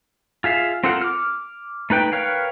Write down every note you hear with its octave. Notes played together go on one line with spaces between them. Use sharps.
F4 G#4 E5 F5
C4 F4 A4 A#4 F#5
D6 F6
A3 D#4 B4 G5
A#4 B4 C#5 F5 G5